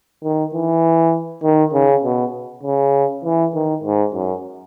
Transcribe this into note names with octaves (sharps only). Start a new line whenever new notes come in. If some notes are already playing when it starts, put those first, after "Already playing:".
D#3
E3
D#3
C#3
B2
C#3
E3
D#3
G#2
F#2